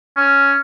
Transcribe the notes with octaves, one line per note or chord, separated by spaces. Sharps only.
C#4